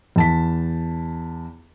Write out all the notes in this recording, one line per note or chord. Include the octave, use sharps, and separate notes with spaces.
E2 A5 B6